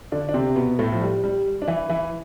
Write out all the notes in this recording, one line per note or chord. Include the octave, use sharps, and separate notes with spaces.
D3 D4
D4
C3 C4
B2 B3
A2 A3
F3
G3
G3
D4
E3 E4
E3 E4